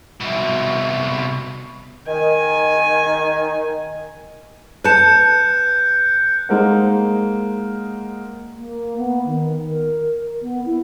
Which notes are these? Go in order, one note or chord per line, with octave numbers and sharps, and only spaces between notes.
C2 B2
D#3 G#5
B4 A5 F#6 G6 C#7
G#3 A#3 D#4 A#4 C5 F#5
A#3
B3
D#3
A#4
B3
E4